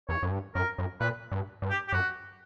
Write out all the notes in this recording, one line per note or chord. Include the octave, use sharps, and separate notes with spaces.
E2 C#5
F#2
G2
F#2 A#4
F#2
A#2 B4
G2
G2
G4
G4
F#2 F#4